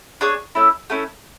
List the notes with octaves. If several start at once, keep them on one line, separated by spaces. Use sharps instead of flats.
D4 G#4 C#5
A3 C#4 E4
A3 C#4 E4